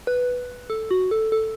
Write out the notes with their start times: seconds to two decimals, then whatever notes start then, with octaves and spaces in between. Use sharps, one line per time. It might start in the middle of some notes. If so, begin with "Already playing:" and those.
0.07 B4
0.70 A4
0.91 F#4
1.11 A4
1.32 A4